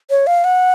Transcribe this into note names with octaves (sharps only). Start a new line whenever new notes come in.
C#5
F5
F#5